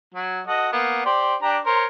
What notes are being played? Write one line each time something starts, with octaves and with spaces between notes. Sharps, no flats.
F#3
F#4 A4 D#5
A#3 B3
G4 C5 D5
D4 G4 A#5
A#4 C5 C#5